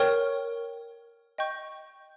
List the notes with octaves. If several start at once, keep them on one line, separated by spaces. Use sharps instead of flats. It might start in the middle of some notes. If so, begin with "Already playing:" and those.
Already playing: A#4 C#5 G5 C#6 F6
D#5 G5 C#6 G6